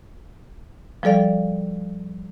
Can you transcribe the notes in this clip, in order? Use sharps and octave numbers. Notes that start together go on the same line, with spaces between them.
F3 G3 A4 D5 F5